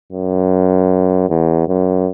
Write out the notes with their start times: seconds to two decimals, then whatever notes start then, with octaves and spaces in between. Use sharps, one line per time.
0.13 F#2
1.30 E2
1.68 F#2